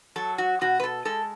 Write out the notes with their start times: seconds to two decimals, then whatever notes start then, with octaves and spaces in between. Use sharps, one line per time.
0.16 F#3 A4
0.38 F#4
0.61 B2 F#4
0.80 B4
0.84 A4
1.05 G#3 A4